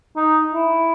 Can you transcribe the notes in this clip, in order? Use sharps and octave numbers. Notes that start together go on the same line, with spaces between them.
D#4
E4